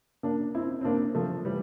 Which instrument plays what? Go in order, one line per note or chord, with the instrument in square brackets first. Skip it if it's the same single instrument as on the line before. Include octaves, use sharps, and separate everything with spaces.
[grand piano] A#3 D4
C4 E4
C4
A#3 D4
F3 A3
E3 G3